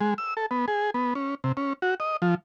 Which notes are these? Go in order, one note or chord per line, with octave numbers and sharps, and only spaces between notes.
G#3
E6
A4
B3
G#4
B3
C#4
C3
C#4
F#4
D#5
F3